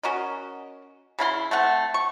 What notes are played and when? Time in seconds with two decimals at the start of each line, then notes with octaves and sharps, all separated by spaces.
0.03 C#4 F#4 A#4 D#5
1.19 C#3 E4 F4 C6
1.51 A3 C4 F#5
1.94 C#6